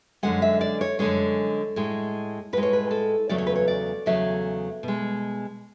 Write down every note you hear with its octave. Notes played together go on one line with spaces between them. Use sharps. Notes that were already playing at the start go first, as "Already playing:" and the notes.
F#2 D3 G#3 F#5
E5
D5
C#5
F#2 D3 G#3 C#5
A2 G#3
A2 G#3 B4
C#5
B4
A4
E2 C#3 F#3 A3 D5
C#5
B4
C#5
D5
E2 C#3 F#3 A3 E5
B2 G#3